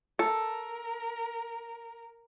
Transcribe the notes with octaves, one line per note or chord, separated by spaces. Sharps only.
A4 A#4